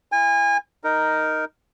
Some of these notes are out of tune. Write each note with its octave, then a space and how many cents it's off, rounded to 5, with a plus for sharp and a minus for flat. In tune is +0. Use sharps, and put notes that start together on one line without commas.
E4 +30 G#5 -30
D#4 +0 A#4 +0